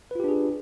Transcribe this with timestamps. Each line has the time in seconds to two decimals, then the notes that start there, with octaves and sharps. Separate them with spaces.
0.11 B4
0.15 F4
0.20 G4
0.24 D4
0.28 G#4